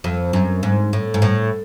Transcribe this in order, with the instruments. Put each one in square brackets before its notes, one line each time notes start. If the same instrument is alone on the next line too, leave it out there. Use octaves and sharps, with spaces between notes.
[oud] F2
F#2
G#2
A2
G#2
A2